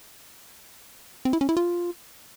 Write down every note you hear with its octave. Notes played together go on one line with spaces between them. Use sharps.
C4
E4
C#4
E4
F4